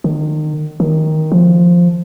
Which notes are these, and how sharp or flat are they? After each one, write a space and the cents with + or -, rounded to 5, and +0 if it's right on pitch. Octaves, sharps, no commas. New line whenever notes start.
D#3 -30
D#3 +10
F3 +0